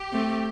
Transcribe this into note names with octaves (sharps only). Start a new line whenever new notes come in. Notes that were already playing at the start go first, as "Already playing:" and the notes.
Already playing: G4
A3 C4